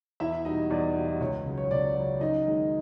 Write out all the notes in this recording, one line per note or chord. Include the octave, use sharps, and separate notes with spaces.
E2 E4 E5
B2 G3 D#4 D#5
E2 D5
B2 G3
C#2 C#5
C#3 F#3
C#5
C#2 D5
C#3 F#3
F#2 D#4 D#5
D#3 G#3